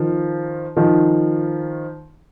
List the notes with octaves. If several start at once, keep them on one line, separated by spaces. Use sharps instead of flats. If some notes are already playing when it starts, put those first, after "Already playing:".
Already playing: D#3 F3
D#3 F3